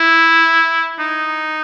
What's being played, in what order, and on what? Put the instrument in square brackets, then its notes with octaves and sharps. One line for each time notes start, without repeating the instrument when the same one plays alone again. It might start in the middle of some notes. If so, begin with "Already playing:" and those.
Already playing: [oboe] E4
D#4